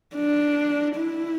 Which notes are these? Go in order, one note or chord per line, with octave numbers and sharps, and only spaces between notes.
D4
E4